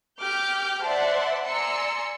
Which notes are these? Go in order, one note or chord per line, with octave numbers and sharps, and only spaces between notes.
G4 D6 F6 G6
C5 D5 E5 F#5 A5 C6
D5 G#5 A#5 C6 E6 C#7